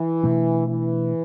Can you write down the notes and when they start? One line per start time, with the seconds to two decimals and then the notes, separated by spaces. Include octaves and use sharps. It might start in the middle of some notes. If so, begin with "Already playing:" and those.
Already playing: E3
0.23 B2 A3 D4
0.68 E3